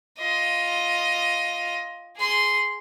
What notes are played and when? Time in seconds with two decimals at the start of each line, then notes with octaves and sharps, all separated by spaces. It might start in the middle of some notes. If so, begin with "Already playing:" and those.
0.19 F4 D#5
2.17 G#4 C6